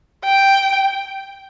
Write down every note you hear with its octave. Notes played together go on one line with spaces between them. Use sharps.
G5